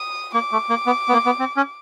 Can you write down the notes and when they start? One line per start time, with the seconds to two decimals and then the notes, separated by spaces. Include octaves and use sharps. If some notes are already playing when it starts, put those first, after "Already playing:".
Already playing: D#6
0.34 A#3 D6
0.52 A3
0.70 A#3
0.86 B3
1.09 B3
1.13 A#3
1.26 B3
1.39 C4
1.57 C#4